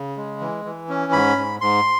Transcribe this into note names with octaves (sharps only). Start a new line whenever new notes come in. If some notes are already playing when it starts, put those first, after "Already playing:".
Already playing: C#3
G#3
E3
E3
C#4
G#2 B5
G#2
G#2 C6